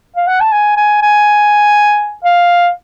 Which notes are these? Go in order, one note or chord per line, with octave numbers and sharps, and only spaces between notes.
F5
F#5
A5
G#5
G#5
G#5
F5